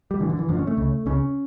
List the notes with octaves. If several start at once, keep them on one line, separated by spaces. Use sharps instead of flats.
G3
A1 G2 D3 E3
D3
E3
A1 G2 D3 F3
C#4
A3
C#2 C#3
C#2 C#3 C#4